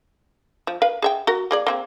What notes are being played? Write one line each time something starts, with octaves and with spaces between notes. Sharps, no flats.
F3
A#4 B4 F5
G#4 E5 G5
F#4 A#4
A#3 G#4 D5
A#3 C4 G#4